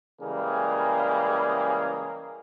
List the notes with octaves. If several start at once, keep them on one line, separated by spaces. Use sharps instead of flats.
C#3 E3 G3 G#3 A#3 G#4